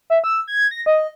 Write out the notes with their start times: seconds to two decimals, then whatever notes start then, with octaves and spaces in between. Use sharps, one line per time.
0.10 E5
0.24 E6
0.48 G#6
0.71 A#6
0.86 D#5